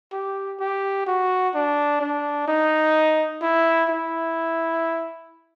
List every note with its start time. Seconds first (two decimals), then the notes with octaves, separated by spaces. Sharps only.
0.12 G4
0.60 G4
1.06 F#4
1.54 D4
2.01 D4
2.48 D#4
3.42 E4
3.89 E4